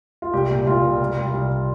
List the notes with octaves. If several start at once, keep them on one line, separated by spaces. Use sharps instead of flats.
F4
C2 G4
A#2
C2 F4
C2
G3
C2
C2